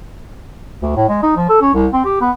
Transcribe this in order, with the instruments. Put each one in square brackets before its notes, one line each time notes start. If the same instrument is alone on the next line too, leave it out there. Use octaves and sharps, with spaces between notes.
[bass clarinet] D2
A2
G#3
D#4
F3
A4
C#4
C2
C4
G4
B3